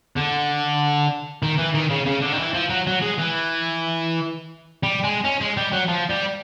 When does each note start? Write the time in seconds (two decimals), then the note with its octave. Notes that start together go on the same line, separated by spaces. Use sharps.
0.16 D3
1.43 D#3
1.58 E3
1.74 D#3
1.90 C#3
2.06 C#3
2.22 D3
2.32 D#3
2.39 E3
2.54 F3
2.70 F#3
2.87 F#3
3.02 G#3
3.18 E3
4.83 G3
5.04 G#3
5.24 C#4
5.41 G#3
5.57 G3
5.72 F#3
5.88 F3
6.10 G3